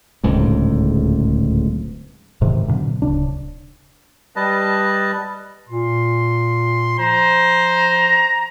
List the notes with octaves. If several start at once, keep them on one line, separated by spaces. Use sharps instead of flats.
D1 C#2 G#2
G#2 C3 D#3 E3
G2 B2 D3 F#3
D1 C2 C#3 D4
G3 B4 D#5 A5
A#2 C6
F3 C5 A#5